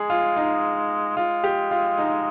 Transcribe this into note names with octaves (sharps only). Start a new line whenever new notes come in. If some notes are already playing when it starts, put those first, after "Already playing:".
Already playing: G#3 G#4
F4
D#4
G#3 F4
G4
F4
D#4